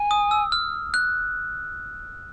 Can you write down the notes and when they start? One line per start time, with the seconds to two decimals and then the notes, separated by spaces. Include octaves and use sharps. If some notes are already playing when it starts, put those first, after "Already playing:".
Already playing: G#5
0.11 D#6
0.31 E6
0.52 F6
0.94 F#6